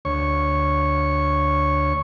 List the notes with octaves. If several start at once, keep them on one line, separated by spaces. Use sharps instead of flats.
D2 C#5 C#6